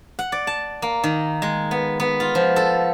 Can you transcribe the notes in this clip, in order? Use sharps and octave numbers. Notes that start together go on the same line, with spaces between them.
F#5
D5
A5
A#3
D#3
G#3
B3
B3
F4
F3
A4